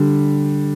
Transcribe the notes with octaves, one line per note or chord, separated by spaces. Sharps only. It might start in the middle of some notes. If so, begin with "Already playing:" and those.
Already playing: D3 G3